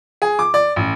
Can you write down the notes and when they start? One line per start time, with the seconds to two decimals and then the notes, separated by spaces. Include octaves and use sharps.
0.22 G#4
0.39 D6
0.54 D5
0.76 A1